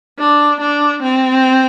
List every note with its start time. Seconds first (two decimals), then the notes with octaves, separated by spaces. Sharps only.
0.19 D4
0.61 D4
1.02 C4